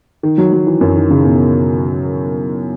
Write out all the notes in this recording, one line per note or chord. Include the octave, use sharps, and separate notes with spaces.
D#3
F#3
F#3
E3
F#2
D#3
C#3
B2